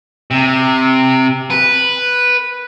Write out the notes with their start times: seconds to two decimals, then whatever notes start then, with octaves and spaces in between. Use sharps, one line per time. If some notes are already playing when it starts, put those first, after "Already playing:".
0.31 C3
1.50 B4